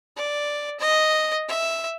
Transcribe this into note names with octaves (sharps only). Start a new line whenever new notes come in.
D5
D#5
E5